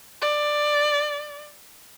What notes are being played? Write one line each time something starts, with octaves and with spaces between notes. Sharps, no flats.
D5